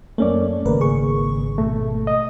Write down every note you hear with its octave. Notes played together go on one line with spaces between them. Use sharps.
F#2 A3 A#3 C#4 D5
G#1 C#3 A#3 A#4 B4
G#4 C#6
B2 A3
D#5